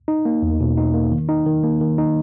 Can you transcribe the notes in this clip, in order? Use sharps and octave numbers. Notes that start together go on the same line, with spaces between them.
D#4
A#3
E2
B2
D#4
A#3
D#3
D#4
D#3
A#3
D#3
D#4